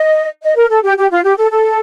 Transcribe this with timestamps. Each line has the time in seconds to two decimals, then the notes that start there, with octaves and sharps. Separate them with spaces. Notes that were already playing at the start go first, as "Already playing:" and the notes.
Already playing: D#5
0.43 D#5
0.57 A#4
0.70 A4
0.83 G4
0.97 G4
1.11 F4
1.24 G4
1.38 A4
1.51 A4